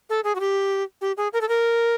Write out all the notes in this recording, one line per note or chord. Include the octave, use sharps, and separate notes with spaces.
A4
G#4
F#4
G4
G4
G#4
A#4
A4
A#4